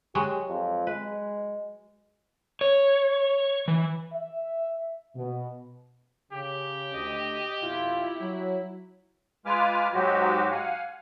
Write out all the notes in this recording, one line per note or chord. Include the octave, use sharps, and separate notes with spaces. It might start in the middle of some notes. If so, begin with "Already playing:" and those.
F#3 G#3 F#4 G4
F2
G#3 B4
C#5
E3
E5
B2
C#3 G4
D2 D#5
F2 B2 E4 F4
F#3
G#3 F4 B4 G#5 D6 F6
G#2 F#3 G#3 F#4 G4
F5 F#5 G#5